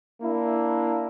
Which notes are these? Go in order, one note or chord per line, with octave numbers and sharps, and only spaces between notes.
A#3 D4 E4